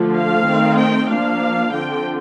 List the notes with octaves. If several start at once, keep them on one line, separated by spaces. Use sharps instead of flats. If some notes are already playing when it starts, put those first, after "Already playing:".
Already playing: D3 F3 A3
F5
D#3 A3 C4
G5
F3 A#3 D4 F5
D3 F3 C4 G5